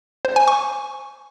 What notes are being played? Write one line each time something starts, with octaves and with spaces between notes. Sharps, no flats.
C5
G#5
C#6